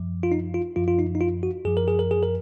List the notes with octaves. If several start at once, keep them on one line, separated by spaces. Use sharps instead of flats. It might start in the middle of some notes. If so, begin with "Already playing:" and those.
Already playing: F#2 F3
F4
D#4
F4
F#2 F3 F4
F4
D#4
D#4
F4
F#4
F#2 F3 G#4
A#4
G#4
A#4
G#4
A#4